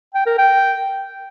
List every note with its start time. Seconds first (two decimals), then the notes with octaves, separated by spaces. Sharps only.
0.14 G5
0.26 A#4
0.38 G5